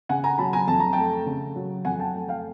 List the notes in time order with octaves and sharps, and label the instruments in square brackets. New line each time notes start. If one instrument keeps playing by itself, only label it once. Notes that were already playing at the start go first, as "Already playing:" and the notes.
[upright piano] C#3 F#5 G#5
G#5 A#5
F#3 A5 B5
G#5 A#5
F2 A5
A#5
A3 G5 A5
C#3
F#3
F2 F#5 G#5
G5 A5
A3
F5 G5